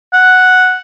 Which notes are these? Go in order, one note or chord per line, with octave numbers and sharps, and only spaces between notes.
F#5